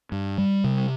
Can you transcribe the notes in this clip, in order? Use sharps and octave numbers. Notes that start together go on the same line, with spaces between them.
G2
G3
C3